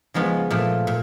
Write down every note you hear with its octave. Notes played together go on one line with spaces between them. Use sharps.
C#3 F3 G#3 B3 D#4
A#2 F3 A3
A#2